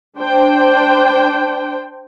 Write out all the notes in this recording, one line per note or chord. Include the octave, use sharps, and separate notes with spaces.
D4 C5 G5